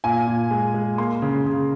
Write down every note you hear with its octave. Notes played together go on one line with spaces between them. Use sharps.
A#2 G#5
A#2
G#3
G#3
A#3 C6
C#3
C#3